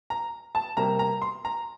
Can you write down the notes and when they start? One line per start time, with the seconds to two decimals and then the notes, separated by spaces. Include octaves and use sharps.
0.10 A#5
0.55 A5
0.77 C3 G3 A#3 A#5
0.99 A#5
1.22 C6
1.45 A#5